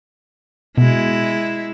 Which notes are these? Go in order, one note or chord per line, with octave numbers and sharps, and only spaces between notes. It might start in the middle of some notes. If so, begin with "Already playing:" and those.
B2 G#3 E4